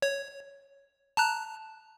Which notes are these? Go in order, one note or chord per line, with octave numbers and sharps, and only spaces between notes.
C#5
A5 A#5 F#6